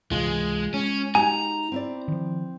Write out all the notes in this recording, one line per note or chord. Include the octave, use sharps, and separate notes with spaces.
C#2 C3 E3 G#3 F4
G#3 C#4
D#4 F#4 G4 G#5 A#5
C4 E4 D5
D#3 F3